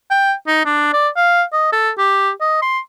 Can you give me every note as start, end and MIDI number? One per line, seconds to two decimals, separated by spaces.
0.10 0.33 79
0.47 0.60 63
0.65 0.92 62
0.93 1.08 74
1.16 1.43 77
1.53 1.71 75
1.72 1.90 69
1.98 2.30 67
2.41 2.61 75
2.62 2.79 84